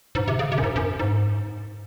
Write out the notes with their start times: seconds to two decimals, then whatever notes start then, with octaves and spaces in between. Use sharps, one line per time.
0.15 G#2
0.28 C3
0.39 C#3
0.52 C3
0.58 F#2
0.64 G#2
0.76 F#2
0.99 G#2